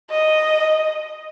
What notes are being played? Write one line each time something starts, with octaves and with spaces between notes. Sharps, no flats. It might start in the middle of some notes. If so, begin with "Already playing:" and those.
D#5